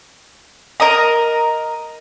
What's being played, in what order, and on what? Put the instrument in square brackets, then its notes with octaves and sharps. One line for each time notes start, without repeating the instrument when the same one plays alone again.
[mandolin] A#4 D#5 A#5